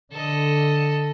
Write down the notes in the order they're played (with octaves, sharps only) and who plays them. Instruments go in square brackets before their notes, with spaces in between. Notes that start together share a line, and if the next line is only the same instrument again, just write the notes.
[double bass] D3 [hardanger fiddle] A4 D#5